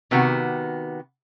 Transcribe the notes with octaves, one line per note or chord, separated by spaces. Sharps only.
C3 D#3 B3 F#4